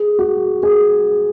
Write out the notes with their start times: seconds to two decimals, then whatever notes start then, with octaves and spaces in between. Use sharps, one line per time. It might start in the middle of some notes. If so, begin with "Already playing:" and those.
Already playing: G#4
0.19 F#4
0.63 G#4